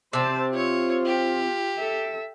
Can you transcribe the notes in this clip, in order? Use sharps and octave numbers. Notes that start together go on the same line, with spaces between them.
C3 C4 C5 A5
F4 C#5
G4
A4 E5